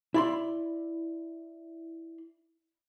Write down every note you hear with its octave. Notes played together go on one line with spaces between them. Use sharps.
E4 D5 C6